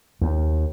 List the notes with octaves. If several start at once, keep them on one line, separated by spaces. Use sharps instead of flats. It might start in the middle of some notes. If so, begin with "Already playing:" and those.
D#2